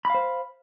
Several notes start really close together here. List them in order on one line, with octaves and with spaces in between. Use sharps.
B5 F5 C5